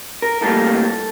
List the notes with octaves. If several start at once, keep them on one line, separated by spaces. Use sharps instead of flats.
A#4
A2 G3 A#3 A4